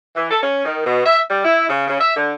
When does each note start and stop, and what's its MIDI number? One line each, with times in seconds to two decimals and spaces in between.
0.16 0.29 52
0.30 0.38 69
0.42 0.62 61
0.65 0.83 51
0.86 1.01 47
1.05 1.20 76
1.30 1.41 55
1.45 1.69 64
1.69 1.86 49
1.87 2.00 49
2.00 2.15 76
2.16 2.32 50